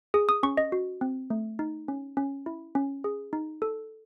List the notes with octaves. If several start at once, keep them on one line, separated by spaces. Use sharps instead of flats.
G#4 D#6
D#6
C#4 C#6
D#5
F#4
C4
A3
D#4
C#4
C#4
E4
C#4
G#4
D#4
A4